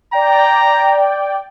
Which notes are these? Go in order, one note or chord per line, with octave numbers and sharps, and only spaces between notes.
D5 G5 A#5